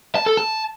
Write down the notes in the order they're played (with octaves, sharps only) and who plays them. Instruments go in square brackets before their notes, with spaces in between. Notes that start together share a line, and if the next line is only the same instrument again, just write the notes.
[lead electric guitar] A5
A4
A5